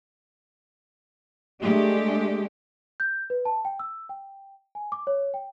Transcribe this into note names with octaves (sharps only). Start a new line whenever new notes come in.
G#3 A3 D4 G4
G6
B4
A5
G5
E6
G5
G#5
D6
C#5
G5